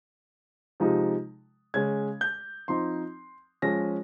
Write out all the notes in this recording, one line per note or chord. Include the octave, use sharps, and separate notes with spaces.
C3 F3 G#3 D#4
C#3 G#3 C#4 G#6
G6
F3 C4 D#4 C6
F3 G#3 C#4 A#6